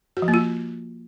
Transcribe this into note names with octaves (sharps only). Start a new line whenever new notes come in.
F#4
F3
A#3
F4